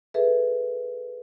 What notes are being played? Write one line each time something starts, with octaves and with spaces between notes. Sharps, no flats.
G#4 A4 B4 E5